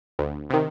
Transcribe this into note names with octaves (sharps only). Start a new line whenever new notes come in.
D2
C3 D#3